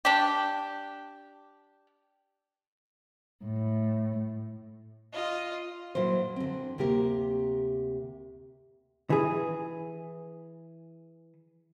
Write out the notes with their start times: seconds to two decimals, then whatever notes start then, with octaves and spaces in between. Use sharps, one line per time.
0.05 D4 G4
3.44 A2
5.12 F4 D#5
5.95 A#2 E3 F#3 C5
6.36 D3 C4
6.78 D2 C3 A#3 G4 A#4
9.10 E3 G#4